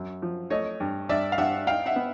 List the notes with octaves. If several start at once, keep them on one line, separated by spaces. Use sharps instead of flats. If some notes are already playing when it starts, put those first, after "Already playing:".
Already playing: F#2
F3
A3 C#5 D#5
G2
G2 D5 E5
F5
G2 E5 F#5
D#4 F5 G5
E5 F#5
B3